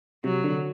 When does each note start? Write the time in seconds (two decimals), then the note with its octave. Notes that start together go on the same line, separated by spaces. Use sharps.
0.24 C3 F#3
0.44 D3